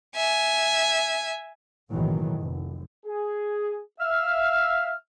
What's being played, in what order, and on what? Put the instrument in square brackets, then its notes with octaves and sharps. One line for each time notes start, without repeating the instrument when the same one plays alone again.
[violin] E5 G#5
[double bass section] F#1 B1 A2 D#3 E3 F#3
F1
[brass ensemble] G#4
[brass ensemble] E5 F5 [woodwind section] E6 F6